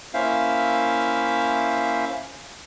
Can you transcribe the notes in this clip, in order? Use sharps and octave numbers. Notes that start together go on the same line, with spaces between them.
A#3 C#4 E4 C5 E5 F5